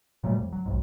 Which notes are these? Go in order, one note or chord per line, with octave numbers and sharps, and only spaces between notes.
A#2 F#3 G3 A3
F2
F#3
B1 F2 G#2